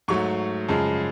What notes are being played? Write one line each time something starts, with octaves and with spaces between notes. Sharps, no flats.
G#2 F#3 A3 C#6
F#2 C#3 F3 G#3 A5